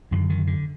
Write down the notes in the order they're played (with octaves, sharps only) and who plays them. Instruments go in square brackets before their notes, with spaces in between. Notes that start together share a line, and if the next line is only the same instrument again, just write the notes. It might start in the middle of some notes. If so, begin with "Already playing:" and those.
[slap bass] F#2 D3 D#3
D#3
D3